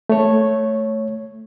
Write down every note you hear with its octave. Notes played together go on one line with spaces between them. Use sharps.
A3 C#5